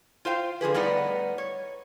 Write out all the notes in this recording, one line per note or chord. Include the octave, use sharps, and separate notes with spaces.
F4 C5 F5 G5
D3 F3 G#4 B4
A2 G3 B3 D#4 D5 F#5
C#5